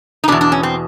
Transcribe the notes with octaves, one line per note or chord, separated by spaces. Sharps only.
D#4
E2 B2 D4
D4
C#4
C4